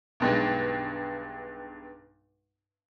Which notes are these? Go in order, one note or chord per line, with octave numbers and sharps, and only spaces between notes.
B1 G2 G#3